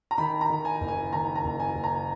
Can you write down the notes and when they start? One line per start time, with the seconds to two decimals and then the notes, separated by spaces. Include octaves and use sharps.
0.11 A#5
0.18 D#3 B5
0.41 A#5
0.50 D#3
0.65 G#5
0.80 F#1
0.88 G#5
1.12 D#3 A#5
1.36 A#5
1.44 F#1
1.60 G#5
1.75 F#1
1.84 A#5